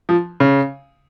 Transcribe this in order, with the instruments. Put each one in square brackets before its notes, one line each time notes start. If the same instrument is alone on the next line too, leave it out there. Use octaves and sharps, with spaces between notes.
[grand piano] F3
C#3